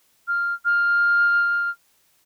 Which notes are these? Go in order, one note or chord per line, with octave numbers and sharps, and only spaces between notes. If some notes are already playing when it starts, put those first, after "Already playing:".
F6
F6